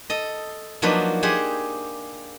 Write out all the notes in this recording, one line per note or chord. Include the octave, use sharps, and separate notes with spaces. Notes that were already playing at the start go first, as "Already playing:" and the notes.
A4 D#5
F3 F#3 A#3 D4 D#4 B4
G4 G#4 C5 F#5 G#5